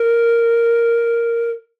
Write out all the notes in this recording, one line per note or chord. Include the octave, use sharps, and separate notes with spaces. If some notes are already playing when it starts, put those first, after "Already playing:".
Already playing: A#4